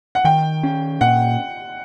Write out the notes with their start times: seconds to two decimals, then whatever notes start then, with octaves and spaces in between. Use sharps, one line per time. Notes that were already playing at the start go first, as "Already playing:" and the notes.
0.15 F#5
0.24 D#3 G5
0.63 C#4
1.01 A#2 F#5